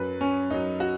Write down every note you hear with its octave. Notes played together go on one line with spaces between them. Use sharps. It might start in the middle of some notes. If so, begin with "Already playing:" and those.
Already playing: F#2 F#3 B4
C#4
F#2 F#3 D#4
F#4